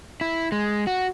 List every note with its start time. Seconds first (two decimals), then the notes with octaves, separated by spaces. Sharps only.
0.21 E4
0.52 G#3
0.87 F#4